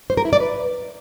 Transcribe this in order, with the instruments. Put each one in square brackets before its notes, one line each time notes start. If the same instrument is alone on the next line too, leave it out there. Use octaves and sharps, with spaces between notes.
[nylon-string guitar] C5
A#4
E4
D5
B4